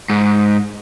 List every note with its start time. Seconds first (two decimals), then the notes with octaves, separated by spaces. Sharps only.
0.10 G#2